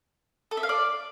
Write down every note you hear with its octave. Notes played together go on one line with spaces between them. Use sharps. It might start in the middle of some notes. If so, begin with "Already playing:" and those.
A4
E5
F5
D5